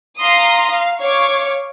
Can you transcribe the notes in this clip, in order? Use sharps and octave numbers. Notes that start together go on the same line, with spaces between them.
F5 A#5 C6 D#6
F5
C#5 F5 C#6 D6 G#6